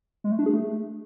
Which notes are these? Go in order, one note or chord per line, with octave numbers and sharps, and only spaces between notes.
G#3
A3
D4
G#4
A3